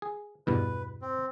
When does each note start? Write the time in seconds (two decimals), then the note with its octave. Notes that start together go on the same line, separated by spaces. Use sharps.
0.02 G#4
0.47 E2 G2 B2 B4
1.02 C4